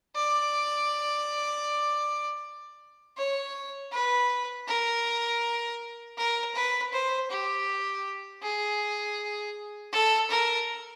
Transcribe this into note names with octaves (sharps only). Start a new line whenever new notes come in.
D5
C#5
B4
A#4
A#4
B4
C5
G4
G#4
A4
A#4